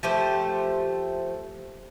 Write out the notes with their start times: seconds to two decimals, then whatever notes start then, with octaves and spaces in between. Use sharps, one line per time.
0.03 F3 A3 G4 C5